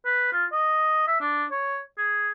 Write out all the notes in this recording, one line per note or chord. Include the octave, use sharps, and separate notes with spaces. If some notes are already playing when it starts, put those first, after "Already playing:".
B4
F4
D#5
E5
D4
C#5
G#4